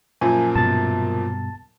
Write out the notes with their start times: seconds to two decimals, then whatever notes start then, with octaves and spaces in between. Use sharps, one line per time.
0.21 F#2 A#2 F3 G#5
0.56 G2 B2 G3 A5 A6